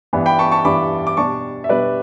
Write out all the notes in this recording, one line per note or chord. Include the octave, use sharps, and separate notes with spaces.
G2 E3 B3 D4
G5 B5
A5 C#6
A5 C#6
G2 E3 B3 D4 B5 D6
D6
B2 G3 D4 A5 C#6
E5
B2 G3 D4 B4 D5